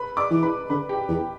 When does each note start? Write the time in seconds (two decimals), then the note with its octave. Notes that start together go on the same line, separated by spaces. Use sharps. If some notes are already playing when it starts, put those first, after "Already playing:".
Already playing: B4 B5
0.17 D5 D6
0.31 E3
0.43 B4 B5
0.69 D3 B4 B5
0.89 G4 G5
1.08 E2